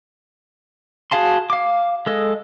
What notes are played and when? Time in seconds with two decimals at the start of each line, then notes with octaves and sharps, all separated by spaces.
1.11 F#4 G#4 F5 A5 C6
1.50 F5 D6
2.06 G#3 A4 D#5